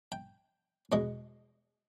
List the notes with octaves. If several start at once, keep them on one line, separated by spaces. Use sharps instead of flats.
G5
E2 B2 G#3 D#5